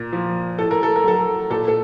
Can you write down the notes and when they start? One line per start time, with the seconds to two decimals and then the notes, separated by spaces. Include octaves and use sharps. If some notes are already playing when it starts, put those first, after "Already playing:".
Already playing: A#2
0.13 F3
0.59 A2 A4
0.71 A#4
0.83 A4
0.96 A#4
1.04 F#3 A4
1.50 A#2 A4
1.68 A4